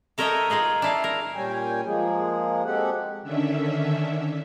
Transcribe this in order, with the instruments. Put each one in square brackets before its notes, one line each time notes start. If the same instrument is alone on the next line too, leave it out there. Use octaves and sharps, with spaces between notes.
[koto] A4 A#4 C#5 D#5 E5 G5
D#4 F4 G#4 D#5
D4 E4 F5
A#4
[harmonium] A#2 G3 C#4 G5 G#5
F3 G#3 A#3 G#4
G#3 C4 F#4 G4 A4 F#5
[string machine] D3 D#3 C#4 D4 E5